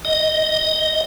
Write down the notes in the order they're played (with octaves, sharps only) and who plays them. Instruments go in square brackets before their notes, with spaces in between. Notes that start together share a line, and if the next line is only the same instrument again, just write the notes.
[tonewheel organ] D#5